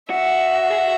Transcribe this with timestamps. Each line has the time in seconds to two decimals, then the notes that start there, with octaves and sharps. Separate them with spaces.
0.10 F#4 E5
0.70 G#4
0.78 F#4